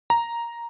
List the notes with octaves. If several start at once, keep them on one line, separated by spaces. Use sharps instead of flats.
A#5